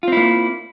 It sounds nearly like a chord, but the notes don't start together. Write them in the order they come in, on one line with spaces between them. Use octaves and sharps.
F4 C4 E4 A#3